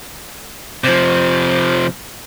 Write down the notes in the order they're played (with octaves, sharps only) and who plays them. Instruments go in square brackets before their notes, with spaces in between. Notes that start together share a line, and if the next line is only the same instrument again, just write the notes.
[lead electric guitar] C3 F3 [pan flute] C5